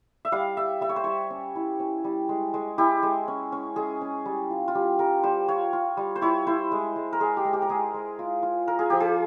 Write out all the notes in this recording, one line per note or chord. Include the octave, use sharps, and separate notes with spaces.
E5
G3 F5
G3 E5
G3 E5
C#5
C5
G3 C#5
C#4
E4
C#4
G3
G#3
G#3
E4 G4
G#3
C#4
C#4
G#3 G#4
C#4
G3
F4
F4
G3 G4
G3 A#4
G3 C5
F4 C#5
F4
G3
C5
E4 C#5
E4 C5
G#3
G#3
A#4
G#3 G#4
G4
G#3
G4
A#4
G#3 G#4
G#3
F4
F4
F4 A#4
G#4
F3 G4
G#4